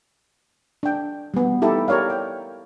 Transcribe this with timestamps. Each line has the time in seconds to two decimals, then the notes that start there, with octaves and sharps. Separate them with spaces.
0.83 D4 G5
1.34 G3 B3
1.62 D#4 E4 G4 A4
1.88 G4 A#4 C#5 D5 F5
2.10 G5